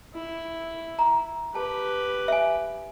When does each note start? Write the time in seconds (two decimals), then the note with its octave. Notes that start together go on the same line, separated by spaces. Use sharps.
0.14 E4
0.99 A#5
1.55 G4 B4 A5
2.28 E5 G#5